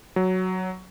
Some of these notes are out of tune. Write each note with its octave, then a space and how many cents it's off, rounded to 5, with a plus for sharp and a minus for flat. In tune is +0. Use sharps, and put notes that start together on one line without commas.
F#3 +5